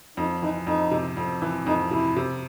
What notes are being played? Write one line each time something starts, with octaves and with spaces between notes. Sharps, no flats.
F2 D#4
E3 D#4
F2 D#4
C3
F2
E3
F2 D#4
C3 E4
C3